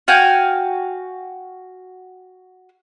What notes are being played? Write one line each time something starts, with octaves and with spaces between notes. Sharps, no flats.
F#4 F5 G5 G#5